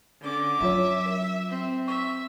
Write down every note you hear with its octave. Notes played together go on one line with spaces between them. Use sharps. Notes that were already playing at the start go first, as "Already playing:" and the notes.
D3 C#4 D6
F#3 E4 F4 C#5 E5
A#4
C4
E5 C#6